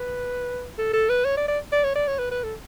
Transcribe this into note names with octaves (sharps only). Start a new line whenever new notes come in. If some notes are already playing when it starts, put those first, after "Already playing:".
Already playing: B4
A4
A4
B4
C#5
D5
D5
D5
C#5
D5
C#5
B4
B4
A4